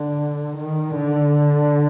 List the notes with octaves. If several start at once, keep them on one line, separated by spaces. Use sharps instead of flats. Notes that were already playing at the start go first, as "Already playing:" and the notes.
Already playing: D3
D#3
D3